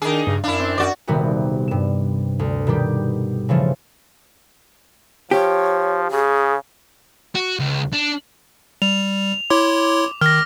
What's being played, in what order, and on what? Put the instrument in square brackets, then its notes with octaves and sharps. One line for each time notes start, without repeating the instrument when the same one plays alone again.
[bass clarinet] D#3 [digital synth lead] D4 [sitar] D#4 G#4
[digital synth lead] G2 [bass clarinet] C#3
[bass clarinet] F#2 [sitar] D4 E4 [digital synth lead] F5
[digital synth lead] C4
[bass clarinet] F#2 [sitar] F#4 D5
[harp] D#1 C3 D#3 G3 B3 F#4
G2 E7
D2
B2 D#3 G3 G4
C#3 E3 F3 A3
[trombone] F3 [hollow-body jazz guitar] G4 [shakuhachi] C#5
[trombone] C#3 [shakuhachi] G#4
[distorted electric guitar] F#4
C#2
D4
[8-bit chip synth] G3 [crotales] F7
[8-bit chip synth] E4 C#5 C6 [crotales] D6
[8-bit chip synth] D#3 [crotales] F6 A#6